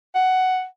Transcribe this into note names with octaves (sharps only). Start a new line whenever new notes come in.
F#5